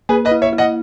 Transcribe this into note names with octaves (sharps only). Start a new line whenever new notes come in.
A#3 G#4 B4
B4 D#5
E4
C#5 E5
E4
D#5 F#5